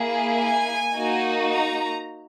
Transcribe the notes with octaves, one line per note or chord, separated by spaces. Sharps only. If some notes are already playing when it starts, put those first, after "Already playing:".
Already playing: A#3 E4 G#4
G#5
A#3 D#4 F#4
A#5